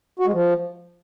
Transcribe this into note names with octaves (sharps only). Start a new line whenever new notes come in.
F#4
G#3
F3